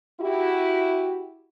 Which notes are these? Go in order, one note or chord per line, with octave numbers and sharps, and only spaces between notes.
E4 F#4 G4